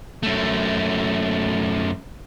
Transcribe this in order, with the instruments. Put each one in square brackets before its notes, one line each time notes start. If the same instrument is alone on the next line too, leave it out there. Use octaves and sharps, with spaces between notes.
[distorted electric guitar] F#2 A3